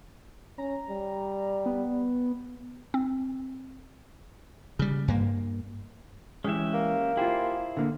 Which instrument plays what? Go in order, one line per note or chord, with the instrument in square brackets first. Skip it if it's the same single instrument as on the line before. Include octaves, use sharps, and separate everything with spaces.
[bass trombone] C#4 [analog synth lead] A#5
[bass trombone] G3
[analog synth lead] B3
[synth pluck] C4
[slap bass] C#3 G3
G2 A#3
[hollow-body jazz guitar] E3 G#3 [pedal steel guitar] C#4 G4 E5
[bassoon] A#3
[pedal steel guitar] E4 G#4 C5 [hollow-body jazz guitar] F4 G4
[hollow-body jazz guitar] D3 A#3